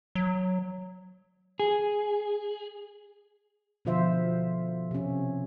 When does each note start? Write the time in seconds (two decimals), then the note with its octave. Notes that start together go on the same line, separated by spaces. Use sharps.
0.15 F#3
1.60 G#4
3.85 B2 D3 F3 F4 C5 E5
4.91 C3 C#4